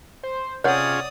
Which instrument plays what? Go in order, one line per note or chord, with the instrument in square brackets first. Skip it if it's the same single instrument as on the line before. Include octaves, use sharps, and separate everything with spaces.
[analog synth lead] C5
[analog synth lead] C3 [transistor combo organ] C#4 F4 G#4 [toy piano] C#5 F#5 [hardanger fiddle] D5 D#6